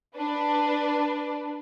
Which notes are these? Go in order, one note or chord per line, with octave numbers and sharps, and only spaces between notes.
D4 B4